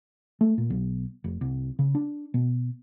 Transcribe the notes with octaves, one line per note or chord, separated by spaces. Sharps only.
A3
A#2
B1
F1
C2
C#3
D4
B2